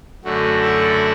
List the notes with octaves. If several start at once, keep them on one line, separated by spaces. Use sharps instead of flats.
F#2 D3 A3 F#4
E4 A4